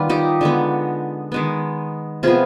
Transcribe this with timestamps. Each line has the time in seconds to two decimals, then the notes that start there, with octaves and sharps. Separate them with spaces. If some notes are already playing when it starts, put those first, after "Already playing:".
Already playing: D#3 G3 B3 F4 B4
0.10 D#4 G4
0.41 D3 G#3 B3
1.32 D#3 G#3 B3
2.23 C3 F3 B3 F4 G#4